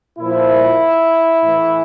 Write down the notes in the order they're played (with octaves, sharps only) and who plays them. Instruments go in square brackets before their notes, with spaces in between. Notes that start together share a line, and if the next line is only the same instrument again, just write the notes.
[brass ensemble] A#2 F3 E4
A2 E3